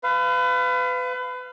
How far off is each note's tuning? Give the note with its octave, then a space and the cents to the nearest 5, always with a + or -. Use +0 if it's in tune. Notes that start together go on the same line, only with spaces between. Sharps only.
B4 +30 F5 -15